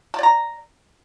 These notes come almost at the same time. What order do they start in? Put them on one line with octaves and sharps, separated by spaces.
A5 D5 A#5